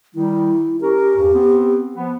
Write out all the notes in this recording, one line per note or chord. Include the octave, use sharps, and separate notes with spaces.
D#3 G3 E4
C#4 G4 A#4
E2 G2
B3 C4
F3 B3